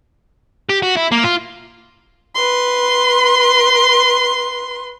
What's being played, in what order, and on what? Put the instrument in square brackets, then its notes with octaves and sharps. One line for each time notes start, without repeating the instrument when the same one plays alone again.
[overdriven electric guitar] G4
F#4
E4
A#3
F4
[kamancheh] B4 C6